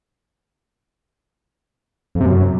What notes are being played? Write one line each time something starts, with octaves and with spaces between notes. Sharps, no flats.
F2
C3
F#2